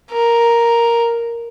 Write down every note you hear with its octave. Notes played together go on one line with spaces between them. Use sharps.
A#4